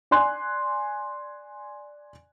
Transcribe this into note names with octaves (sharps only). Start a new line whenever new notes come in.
D5 G#5 C6 F#6